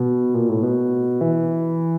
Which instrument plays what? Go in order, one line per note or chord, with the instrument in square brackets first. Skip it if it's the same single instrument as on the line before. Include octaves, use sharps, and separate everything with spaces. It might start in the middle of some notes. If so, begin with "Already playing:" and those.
Already playing: [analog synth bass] B2
A#2
A2
B2
E3